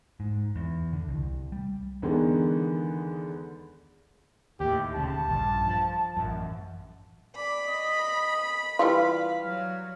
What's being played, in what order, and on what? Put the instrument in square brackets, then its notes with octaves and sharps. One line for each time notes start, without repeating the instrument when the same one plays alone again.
[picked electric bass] G#2
E2
D3
C2
G3
[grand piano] E2 D3 D#3 G#3 B3
[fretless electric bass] D#2 A2 [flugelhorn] G4
[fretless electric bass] D#1 D2 C#3 [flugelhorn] A5
[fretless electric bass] A#1 G2
F3
A1 F#2
[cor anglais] D5 [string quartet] B5
[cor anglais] D#5
[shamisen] E3 G3 F4 [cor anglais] F5
[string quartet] F#3